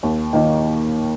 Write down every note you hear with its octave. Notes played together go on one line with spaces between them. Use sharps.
D#2
D#3 A#3 D#4